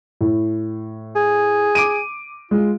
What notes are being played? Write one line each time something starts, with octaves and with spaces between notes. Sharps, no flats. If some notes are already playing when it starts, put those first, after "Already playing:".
A2
G#4
D6 D7 D#7
G#3 F4